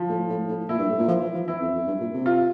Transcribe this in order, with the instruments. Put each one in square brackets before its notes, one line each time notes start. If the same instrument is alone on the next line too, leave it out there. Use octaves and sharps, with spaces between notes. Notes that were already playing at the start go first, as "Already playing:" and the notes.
Already playing: [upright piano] F3
[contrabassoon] A2
A2
A2
[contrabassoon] A#2 [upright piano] E4
[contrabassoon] G2
A2
A#2
F3
E3
F3
[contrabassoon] E3 [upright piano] E4
[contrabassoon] F2
F2
G2
A#2
C3
[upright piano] F4